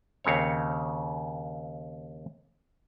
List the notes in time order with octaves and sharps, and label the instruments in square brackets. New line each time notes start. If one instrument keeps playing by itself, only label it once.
[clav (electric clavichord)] D#2 C#3 C4 C#5